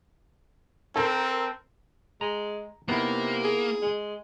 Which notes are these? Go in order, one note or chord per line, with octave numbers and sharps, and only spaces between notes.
C4 A4 A#4
G#3 A#5
C3 A#3 B3 D#4 E4
G#4
G#3